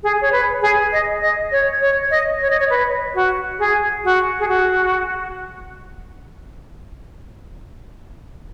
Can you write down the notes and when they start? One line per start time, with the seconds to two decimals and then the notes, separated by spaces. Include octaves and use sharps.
0.03 G#4
0.21 C#5
0.32 B4
0.62 G#4
0.93 D#5
1.22 D#5
1.52 C#5
1.81 C#5
2.11 D#5
2.41 C#5
2.50 D#5
2.59 C#5
2.70 B4
3.15 F#4
3.59 G#4
4.05 F#4
4.40 G#4
4.48 F#4